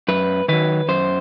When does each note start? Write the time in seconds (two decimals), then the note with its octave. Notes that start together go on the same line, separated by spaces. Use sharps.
0.08 F#2 B4
0.48 D#3 F#3 B4
0.88 F#2 C5